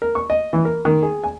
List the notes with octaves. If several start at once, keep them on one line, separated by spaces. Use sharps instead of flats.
A#4
C#6
D#5
E3
A#4
D#3
G#4
G#5